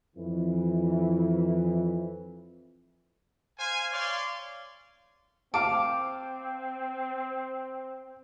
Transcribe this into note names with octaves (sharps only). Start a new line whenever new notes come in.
F2 E3
C5 F5 G#5
C#5 D5 F5 C6
C4 F5 A5 D6